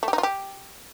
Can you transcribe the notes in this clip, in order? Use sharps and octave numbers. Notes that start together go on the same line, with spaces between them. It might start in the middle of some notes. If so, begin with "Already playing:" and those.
A3
G4
D#4
F4
G4